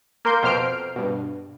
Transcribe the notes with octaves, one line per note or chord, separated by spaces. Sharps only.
A#3 A#4 C6 G6
F2 B2 C5 F6 C7 D7
G2 B2